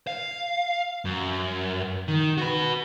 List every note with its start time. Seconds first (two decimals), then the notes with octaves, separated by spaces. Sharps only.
0.07 F5
1.05 F#2
2.08 D#3
2.38 F#4 B4